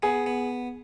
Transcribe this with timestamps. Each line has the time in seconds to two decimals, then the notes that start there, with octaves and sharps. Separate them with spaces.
0.03 B3 G#4
0.26 B3